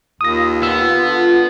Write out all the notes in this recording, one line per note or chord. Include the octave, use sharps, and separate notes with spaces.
D#2 F4 D#6 A#6
B3 E6
D3